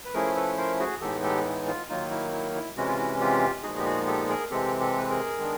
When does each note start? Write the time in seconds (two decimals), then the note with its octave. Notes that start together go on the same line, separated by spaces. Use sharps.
0.05 B4
0.14 F3 A3 C#4 E4 G#4 A#4
0.36 A4 B4
0.57 A#4 C5
0.79 F#4 G#4
1.01 A2 E3 G#3 B3 D#4 G4 A4
1.23 G4 A4
1.45 E4
1.67 F4
1.89 D#3 F#3 A#3 D#4 F4
2.11 E4
2.33 E4
2.55 E4
2.77 C3 E3 G#3 C#4 E4 F#4
2.87 F4
2.98 E4 F#4
3.21 F4 G4
3.63 A#2 F3 G#3 B3 D#4 F#4 G#4
3.78 G4
3.85 F#4 G#4
4.07 G4 A4
4.29 G#4 A#4
4.51 C3 E3 G#3 C4 G4 A4
4.80 G4 A4
4.98 B4
5.09 G#4 A#4
5.38 D#3 G#3 B3 D4